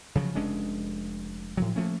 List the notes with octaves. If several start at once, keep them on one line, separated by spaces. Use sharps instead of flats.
C#3 F3 F#3
F1 G#3 C#4 D4
A2 F3 F#3
F3 A3 A#3 C#4